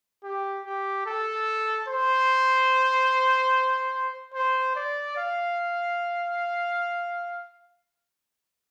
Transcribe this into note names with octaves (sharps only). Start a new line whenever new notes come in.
G4
G4
A4
C5
C5
D5
F5